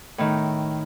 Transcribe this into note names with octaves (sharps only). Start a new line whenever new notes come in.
A2 D#3